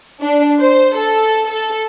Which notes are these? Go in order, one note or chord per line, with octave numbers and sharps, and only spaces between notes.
D4
C5
A4
A4